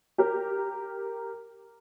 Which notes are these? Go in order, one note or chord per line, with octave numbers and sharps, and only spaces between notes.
G4 A#4